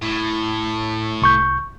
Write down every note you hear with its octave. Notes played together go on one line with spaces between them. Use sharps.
A2
C2 C#6 G6